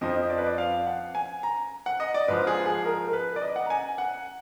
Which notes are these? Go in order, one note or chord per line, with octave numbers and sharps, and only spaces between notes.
F2 F3 D#5
D5
B4
D5
F5
F#5
G#5
A#5
F#5
D#5
D5
G#2 F3 B4
G#4
G#4
A#4
A#4
B4
D5
D#5
F#5
A#5
G#5
F#5